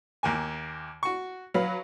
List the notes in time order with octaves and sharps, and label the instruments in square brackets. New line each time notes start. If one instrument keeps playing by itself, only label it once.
[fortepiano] D#2 A#3 G#5
F#4 C#6
[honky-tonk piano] F#3 B4 [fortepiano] F5 B5